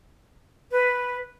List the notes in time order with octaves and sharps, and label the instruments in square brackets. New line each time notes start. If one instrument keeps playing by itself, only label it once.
[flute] B4